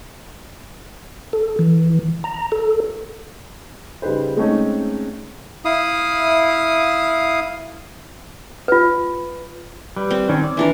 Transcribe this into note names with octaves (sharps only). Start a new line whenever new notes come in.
A4
E3
A#5
A4
C#3 G3 D#4 B4 C5
G#3 A3 C4 C#4 D#4
E4 F5 D#6
F4 B4
G3 B4
C4
D#3 C#4
D5
E3 D4 A#4